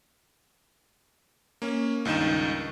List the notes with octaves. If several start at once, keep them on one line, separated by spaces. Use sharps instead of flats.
A#3 C#4
C#2 G2 D#3 D#4 E7